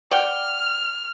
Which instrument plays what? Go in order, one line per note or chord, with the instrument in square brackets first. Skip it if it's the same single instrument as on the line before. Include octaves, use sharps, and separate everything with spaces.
[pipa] D5 F#5 G5 [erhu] F6